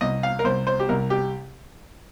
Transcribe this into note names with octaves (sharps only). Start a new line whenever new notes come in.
C2 D#5
F5
A#4
C2 C5
C5
G4
C2 A#4
G4